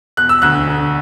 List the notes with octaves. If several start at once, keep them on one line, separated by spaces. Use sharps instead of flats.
E1 F#6
E6
D2 F#6
D3